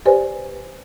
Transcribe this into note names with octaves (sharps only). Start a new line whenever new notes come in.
G4 B4 C5 D5 G#5